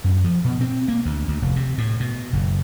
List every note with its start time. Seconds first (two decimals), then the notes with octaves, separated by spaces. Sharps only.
0.04 F#2
0.24 F3
0.45 B2
0.61 C4
0.88 A#3
1.05 D2
1.28 D2
1.42 F1
1.56 C3
1.78 A2
2.00 B2
2.33 F#1